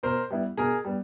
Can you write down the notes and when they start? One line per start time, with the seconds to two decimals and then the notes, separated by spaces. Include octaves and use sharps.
0.03 B2 A#4 C5
0.30 G3 B3 E4
0.57 B2 G#4 A#4
0.85 G3 B3